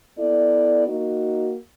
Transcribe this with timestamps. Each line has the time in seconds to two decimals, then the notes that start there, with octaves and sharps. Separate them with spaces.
0.18 B3 E4 A4 D5
0.87 A#3 D#4 F#4